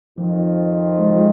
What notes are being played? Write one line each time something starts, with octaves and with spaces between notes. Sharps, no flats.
F2 D#3 F3 C4 F4
G#3
F3
G#3